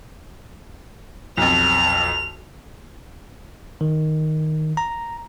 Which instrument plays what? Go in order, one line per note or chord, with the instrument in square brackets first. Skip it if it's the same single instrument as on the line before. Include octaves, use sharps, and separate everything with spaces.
[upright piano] B1 F2 [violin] F7
[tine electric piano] D#3
A#5